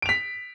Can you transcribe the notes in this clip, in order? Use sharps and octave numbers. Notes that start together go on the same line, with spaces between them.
B6 D7 F7